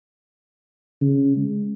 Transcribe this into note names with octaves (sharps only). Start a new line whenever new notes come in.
C#3
G#3